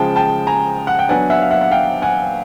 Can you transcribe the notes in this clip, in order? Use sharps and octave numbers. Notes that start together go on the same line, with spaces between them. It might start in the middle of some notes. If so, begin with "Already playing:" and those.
Already playing: C#3 F3 G#3 G5 A5
G5 A5
G#5 A#5
F#5
G5
F#3 B3 D4 F#5 G#5
E5 F#5
F5
E5 F#5
F#5
F5 G5
F#5 G#5